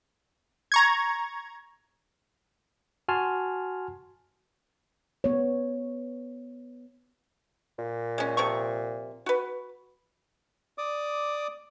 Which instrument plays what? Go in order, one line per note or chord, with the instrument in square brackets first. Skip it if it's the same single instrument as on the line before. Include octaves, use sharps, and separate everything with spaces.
[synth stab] A#5 C#6 G#6
[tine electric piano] F#4 G#5 A5 C6 F6
[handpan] B3 C#5
[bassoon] A#2
[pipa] G#3 C#4
C3 F3 C#6
F#4 B4
[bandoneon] D5 D6 D#6